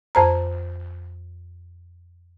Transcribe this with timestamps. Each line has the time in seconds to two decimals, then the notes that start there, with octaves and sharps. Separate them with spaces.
0.15 F2 C5 A#5